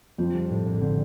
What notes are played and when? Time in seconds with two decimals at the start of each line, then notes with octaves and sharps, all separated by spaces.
0.18 F2 F3 C4
0.34 G3
0.50 A2
0.66 A#1
0.81 D3 C4